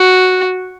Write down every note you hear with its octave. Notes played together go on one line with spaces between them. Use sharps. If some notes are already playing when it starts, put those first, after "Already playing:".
Already playing: F#4